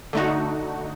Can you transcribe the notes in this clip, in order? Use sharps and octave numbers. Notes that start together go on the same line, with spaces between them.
D3 A3 D#4 F#4